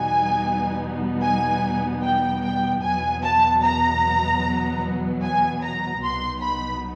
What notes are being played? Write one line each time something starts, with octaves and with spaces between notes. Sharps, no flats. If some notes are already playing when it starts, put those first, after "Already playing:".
Already playing: E2 B2 G3 B3 D#4 G#5
G#5
G5
G5
E2 B2 F#3 B3 G#5
A5
A#5
G#5
A#5
C2 B2 F#3 B3 D#4 C6
B5